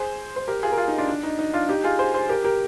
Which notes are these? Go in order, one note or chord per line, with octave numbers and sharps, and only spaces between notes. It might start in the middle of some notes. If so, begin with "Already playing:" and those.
Already playing: G#4 C5
C5
G4 A#4
F4 G#4
A#4
F4 G#4
D#4
D4 F4
D4
D#4
D#4
D4 F4
D#4 G4
F4 G#4
G#4 C5
G#4 C5
G4 A#4
G4 A#4